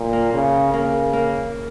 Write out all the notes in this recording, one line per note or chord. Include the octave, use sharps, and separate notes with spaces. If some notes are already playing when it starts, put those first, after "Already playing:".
Already playing: A#2
A#3
C#3
C#3 A#3
A#3